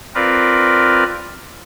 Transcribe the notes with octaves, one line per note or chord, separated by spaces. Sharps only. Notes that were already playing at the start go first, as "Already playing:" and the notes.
C4 F4 A#4 B4 D5